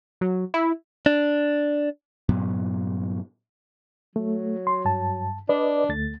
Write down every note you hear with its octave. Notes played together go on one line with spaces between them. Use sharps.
F#3
E4
D4
G2 A#2 F#3 B3
F#3 A3
C6
G2 A5
D4 B4 D5 D#5
D2 A3 A6